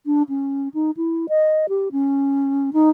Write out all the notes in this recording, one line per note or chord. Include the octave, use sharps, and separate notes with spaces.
D4
C#4
D#4
E4
D#5
G4
C#4
D#4